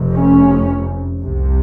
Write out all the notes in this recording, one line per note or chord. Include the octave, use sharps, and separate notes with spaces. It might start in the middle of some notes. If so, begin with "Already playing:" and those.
Already playing: F1 F2 C3
C#4
C2 C3